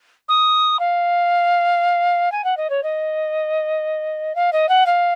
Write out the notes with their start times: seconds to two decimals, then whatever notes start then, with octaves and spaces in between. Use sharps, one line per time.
0.28 D#6
0.79 F5
2.32 G#5
2.44 F#5
2.57 D#5
2.70 C#5
2.83 D#5
4.35 F5
4.52 D#5
4.69 F#5
4.86 F5